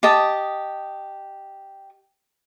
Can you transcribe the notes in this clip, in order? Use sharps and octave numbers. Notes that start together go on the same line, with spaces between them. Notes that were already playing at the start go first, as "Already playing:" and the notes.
G4 D#5 A5 D#6